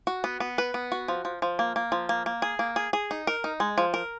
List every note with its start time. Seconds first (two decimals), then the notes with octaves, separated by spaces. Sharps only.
0.07 F#4
0.24 B3
0.40 B3
0.58 B4
0.74 B3
0.92 F#4
1.08 F3
1.25 F3
1.42 F3
1.59 A#3
1.76 A#3
1.92 F3
2.09 A#3
2.26 A#3
2.42 G#4
2.59 A#3
2.76 G#4
2.93 G#4
3.11 D#4
3.27 A#4
3.44 D#4
3.60 G#3
3.78 F3
3.94 A#4